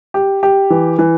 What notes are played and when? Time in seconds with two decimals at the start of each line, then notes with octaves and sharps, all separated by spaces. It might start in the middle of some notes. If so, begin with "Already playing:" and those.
0.14 G4
0.43 G4
0.70 E3
0.99 E3